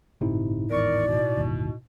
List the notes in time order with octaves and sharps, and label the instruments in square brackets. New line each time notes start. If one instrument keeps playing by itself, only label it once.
[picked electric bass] G1 C3 [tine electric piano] A2 D#4 E4
[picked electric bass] G#1 E2 [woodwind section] A#4 C#6 [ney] D5
[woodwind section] B2
[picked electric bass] G1 D#2